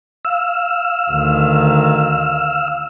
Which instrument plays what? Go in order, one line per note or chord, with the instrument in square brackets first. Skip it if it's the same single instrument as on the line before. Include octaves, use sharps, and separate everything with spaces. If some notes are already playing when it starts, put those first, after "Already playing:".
[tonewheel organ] F5 E6
[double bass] D2 D#3